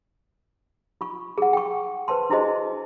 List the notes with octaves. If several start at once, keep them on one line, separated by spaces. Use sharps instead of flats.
F4 C#6
G#4 F#5
G5 C#6
B4 C5 A5 C6
D4 E4 F#4 G#4 C5 D#5